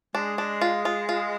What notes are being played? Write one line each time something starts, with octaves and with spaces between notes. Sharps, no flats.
G#3 D4
D4
F4
F4
F4